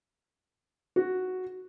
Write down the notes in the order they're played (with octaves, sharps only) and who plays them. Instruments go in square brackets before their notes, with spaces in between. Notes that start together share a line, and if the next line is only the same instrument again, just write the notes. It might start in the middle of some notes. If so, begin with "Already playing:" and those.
[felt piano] F#4